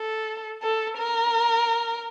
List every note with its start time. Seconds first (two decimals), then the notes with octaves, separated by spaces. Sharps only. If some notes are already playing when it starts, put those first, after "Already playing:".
Already playing: A4
0.63 A4
0.98 A#4